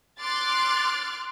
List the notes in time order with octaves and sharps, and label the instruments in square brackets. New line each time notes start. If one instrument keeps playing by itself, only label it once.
[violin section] C6 D6 F6 F#6 A6